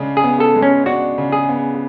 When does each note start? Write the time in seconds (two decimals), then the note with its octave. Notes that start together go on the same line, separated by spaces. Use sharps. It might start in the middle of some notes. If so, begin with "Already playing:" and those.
Already playing: C#3 G#3 D4
0.17 G#4
0.24 B3
0.40 A4
0.55 G#3
0.62 C#4
0.86 D4 F#4
1.18 C#3
1.32 G#4
1.49 B3